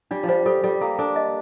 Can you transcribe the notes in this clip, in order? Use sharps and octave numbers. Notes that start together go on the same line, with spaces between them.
G3 D4
F3
G3 C5
G3 A4
G3 A4
A#3 A4
D4 A4
D#5